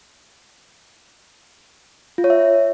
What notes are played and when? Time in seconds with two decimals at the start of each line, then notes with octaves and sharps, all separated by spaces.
2.18 F4
2.24 C#5
2.30 E5